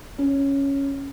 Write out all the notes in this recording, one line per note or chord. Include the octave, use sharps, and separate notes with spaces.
C#4